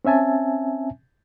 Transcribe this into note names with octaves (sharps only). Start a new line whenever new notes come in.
C4 C#4 E5 G#5 A5